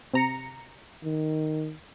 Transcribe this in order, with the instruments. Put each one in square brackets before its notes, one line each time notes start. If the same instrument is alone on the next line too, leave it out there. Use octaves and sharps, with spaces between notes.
[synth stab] C3 A#5 C#7
[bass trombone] D#3